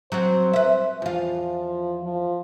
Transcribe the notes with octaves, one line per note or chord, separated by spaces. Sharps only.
F#3 C4 F#4 C5
B4 E5
E2 F3 F4
F3